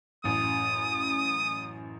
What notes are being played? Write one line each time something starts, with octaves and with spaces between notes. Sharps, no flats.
A1 F#2 D#6